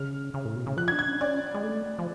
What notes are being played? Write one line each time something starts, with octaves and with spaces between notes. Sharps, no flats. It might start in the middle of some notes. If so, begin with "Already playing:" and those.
Already playing: C#3 F6
C#3
A2
B2
C#3
F3 F#6
G#6
D4
G#6
C#4
C#4 D5
G#3
A3
F3